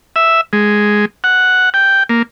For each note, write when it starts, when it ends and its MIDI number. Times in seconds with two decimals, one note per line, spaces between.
0.16 0.41 76
0.53 1.05 56
1.24 1.69 78
1.74 2.03 79
2.09 2.22 58